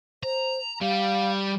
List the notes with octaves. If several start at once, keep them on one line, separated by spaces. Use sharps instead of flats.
C5 A#5
G3 F5